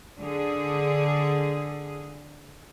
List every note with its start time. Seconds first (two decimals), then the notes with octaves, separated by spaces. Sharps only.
0.19 D3 G#4